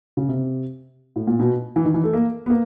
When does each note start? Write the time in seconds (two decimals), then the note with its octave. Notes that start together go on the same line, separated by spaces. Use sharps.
0.17 C#3
0.29 C3
1.16 A2
1.27 A#2
1.40 B2
1.76 E3
1.85 D#3
1.94 E3
2.04 A3
2.13 A#3
2.46 B3
2.50 A#3